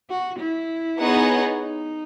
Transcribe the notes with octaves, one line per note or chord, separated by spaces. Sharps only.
F#4
E4
B3 D#4 G#4 C#5 F#5
D#4